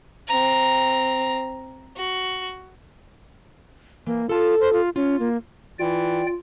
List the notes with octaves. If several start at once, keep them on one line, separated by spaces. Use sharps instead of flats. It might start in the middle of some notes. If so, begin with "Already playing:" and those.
C4 A#5
F#4
E3 A#3
F4 A4 A5
C5
F4
C#4 F4
A#3
E3 F4 D5 G5